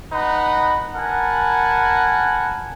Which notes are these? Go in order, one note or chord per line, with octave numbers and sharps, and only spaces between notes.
D#4 B4 F#5 B5
A#4 F#5 G#5 A5 B5